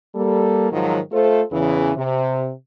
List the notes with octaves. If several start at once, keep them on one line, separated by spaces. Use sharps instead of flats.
G3 A#3 A4
G#2 D#3 F3 F#3
A3 F4 A4 C5
E2 C#3 E3
C3